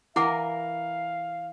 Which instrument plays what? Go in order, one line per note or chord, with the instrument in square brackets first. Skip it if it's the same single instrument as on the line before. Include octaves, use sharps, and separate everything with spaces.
[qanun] E3 A#4 [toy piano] E4 F#5 D6 [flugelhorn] F5